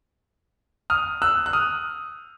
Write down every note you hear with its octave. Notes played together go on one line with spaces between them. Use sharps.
D#6 F6
E6 F#6
F#6
D#6 F6